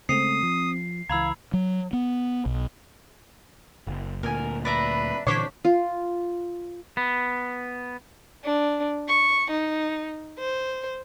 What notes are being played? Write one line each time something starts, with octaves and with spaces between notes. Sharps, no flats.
C#3 G#3 A3 C4 D#6 C7
F3
C#2 E3 F5 A#5 B5 E6 G#6
F#3
B3
B1
F#1
D2 A#2 A#4 G#5
D4 B4 E5 A#5 B5
A#2 D3 E3 D4 C5 C#5 D6 B6
F4
B3
D4
C#6
D#4
C5